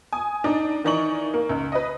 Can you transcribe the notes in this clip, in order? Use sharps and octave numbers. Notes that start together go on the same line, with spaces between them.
G#5 D#6
D4 D#4
D#3 E3 D#4 D5 C#6 F#7
A#3
C#2
B4 D#5